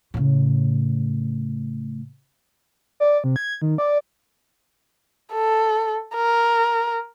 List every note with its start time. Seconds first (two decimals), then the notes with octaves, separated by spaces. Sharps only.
0.14 A2 C#3
3.00 D5
3.24 C3
3.36 G#6
3.62 D#3
3.78 D5
5.33 A4
6.15 A#4